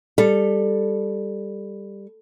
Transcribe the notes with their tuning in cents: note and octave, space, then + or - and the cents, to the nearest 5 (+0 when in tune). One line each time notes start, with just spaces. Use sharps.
G3 +15 A4 +5